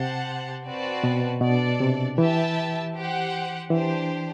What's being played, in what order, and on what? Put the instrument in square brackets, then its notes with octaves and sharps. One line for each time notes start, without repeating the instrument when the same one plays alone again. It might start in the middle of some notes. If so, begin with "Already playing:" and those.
Already playing: [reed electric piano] C3 [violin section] G4 C5 F#5 A5
[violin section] C4 F#4 B4 D5 A5
[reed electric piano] B2
[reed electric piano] B2 [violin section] D4 A4 D5
[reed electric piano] C3
[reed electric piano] E3 [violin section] G4 B4 E5 A5
[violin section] G4 C5 F#5
[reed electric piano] E3 [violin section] D4 G4 C5